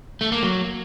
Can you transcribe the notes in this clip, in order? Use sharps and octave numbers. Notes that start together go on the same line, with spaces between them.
A3
A#3
F#3